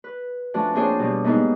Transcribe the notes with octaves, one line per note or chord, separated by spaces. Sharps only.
B4
F3 A3 C#4 D4 F#4
A#3 C4 D4 G#4 C5 C#5
B2 G3
G#2 A#3 B3 D#4 G#4